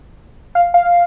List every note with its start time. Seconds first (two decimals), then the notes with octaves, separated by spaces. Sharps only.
0.55 F5
0.74 F5